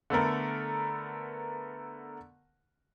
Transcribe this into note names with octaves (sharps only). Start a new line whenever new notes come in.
D3 A3 B3 A#4